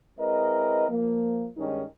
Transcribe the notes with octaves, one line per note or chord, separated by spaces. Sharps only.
G#3 C4 E4 A#4 B4 D#5
F3 A#3
G2 D#3 G#3 C#4 D#4